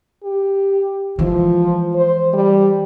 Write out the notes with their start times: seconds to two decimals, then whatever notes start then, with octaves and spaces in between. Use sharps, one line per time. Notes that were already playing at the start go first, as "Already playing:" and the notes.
0.23 G4
1.19 E3 F3 G#3
1.95 C5
2.33 G3